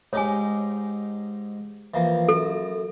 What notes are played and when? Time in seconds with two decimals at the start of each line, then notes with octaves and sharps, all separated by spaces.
0.13 G#2 D#4 G4 C#5 G#5
1.94 E3 F3 A#3
2.29 F#2 A4